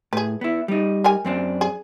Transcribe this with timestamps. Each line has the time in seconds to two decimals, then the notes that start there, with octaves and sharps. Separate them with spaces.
0.13 A2 G#4 B4
0.41 B3 E4
0.68 G3 D#4
1.04 G4 A#4 G#5
1.25 F#2 C4 D4
1.61 G#4